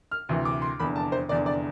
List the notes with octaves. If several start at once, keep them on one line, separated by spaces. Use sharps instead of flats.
F6
D2 C3 E3
D6
C6
F1 E2 D3 B5
A5
C5
F1 E2 D3 D5
D5